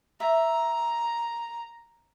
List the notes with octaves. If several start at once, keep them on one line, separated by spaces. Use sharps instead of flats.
E5 A#5